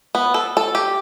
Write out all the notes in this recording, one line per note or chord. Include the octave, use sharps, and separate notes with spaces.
B3
A4
A4
G4